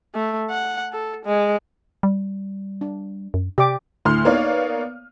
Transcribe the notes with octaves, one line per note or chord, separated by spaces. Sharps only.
A3
F#5
A4
G#3
G3
D4
F#2
C3 G4 D5 D6
D2 A2 C6 F6
A#3 B3 D#4 C#5 D5 F5